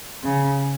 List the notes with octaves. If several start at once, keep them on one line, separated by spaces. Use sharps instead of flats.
C#3